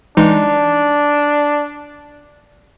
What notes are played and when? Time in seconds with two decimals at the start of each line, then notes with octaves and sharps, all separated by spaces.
0.17 E3 G#3 D4 D#4